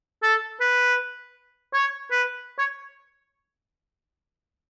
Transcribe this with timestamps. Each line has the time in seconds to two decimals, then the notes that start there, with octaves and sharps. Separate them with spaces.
0.23 A4
0.61 B4
1.74 C#5
2.11 B4
2.59 C#5